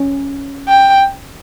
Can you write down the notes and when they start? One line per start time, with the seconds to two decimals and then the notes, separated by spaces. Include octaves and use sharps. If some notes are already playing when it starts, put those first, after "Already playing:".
Already playing: C#4
0.68 G5